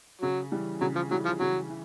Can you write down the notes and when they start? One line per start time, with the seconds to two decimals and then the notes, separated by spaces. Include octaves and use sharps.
0.22 C#3 F#3
0.52 E3 G3
0.81 C#3 F#3
0.96 F3
1.10 E3 F#3 G3
1.25 F3
1.40 C#3 F#3
1.70 E3